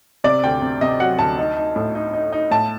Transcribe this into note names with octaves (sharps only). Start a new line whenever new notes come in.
C3 D5
D2 G5
C3
C3 D#5
F#3 F#5
D2 A5
D#4
D#4
A2
D#4
D#4
D#4
A2 A5